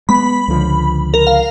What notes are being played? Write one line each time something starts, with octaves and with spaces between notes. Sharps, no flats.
G#3 B3 B5
C#2 D3 F3
A#4
F5